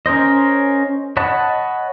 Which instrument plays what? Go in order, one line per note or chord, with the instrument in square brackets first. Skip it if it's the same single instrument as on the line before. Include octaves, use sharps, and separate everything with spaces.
[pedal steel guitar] C#4 A#4 C5 D#5
C#5 D#5 F#5 A5 B5